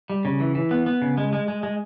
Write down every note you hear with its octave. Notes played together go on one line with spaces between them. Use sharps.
G3
C#3
E3
E3
B3
B3
C#3
G#3
G#3
G#3
G#3